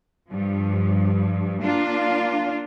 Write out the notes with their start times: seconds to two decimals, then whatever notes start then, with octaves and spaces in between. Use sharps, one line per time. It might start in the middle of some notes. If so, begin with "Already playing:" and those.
0.31 G2 F3
1.61 A#3 D4 F4